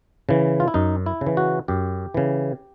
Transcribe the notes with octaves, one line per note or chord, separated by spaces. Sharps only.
C#3 E3
F4
E4
F#2 D#4
E4
C#3
E3
F#4
F#2 G4
C#3 E3